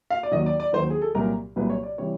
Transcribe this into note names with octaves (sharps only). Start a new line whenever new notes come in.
F5
D5
D#2 D#3 F#3 D#5
D5
D5
D#2 D#3 F#3 C5
G#4
A4
C2 A#2 F#3 A#4
C2 A#2 F#3 B4
C#5
D5
C3 E3 G3 C#5